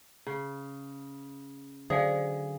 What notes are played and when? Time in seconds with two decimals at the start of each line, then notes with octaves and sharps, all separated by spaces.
0.27 C#3
1.90 D3 F#3 G#4 C5 D5 F5